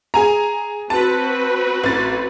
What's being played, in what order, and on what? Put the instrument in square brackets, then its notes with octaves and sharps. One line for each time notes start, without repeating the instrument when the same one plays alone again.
[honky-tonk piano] G#4 G#5 A#5
[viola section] C4 F#4 B4 [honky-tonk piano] A5
[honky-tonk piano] A1 A6